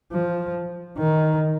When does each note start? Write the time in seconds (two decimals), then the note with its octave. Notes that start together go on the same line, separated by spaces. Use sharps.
0.12 F3
0.98 D#3